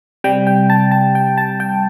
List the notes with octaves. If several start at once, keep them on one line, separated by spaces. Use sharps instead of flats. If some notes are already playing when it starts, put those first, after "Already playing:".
C3 G3 G5
G5
A5
A5
G5
A5
G5